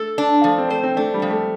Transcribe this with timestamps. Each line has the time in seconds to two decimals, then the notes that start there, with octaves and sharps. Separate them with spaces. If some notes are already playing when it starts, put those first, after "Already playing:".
Already playing: A3 A4
0.18 D4
0.44 F3 A3
0.58 C4
0.71 A3 C5
0.83 C4
0.96 A3 D4
1.14 G3
1.22 F3
1.30 A3